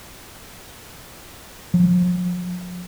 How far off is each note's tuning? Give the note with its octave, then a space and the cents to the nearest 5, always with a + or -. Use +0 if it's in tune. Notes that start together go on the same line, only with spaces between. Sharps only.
F3 +45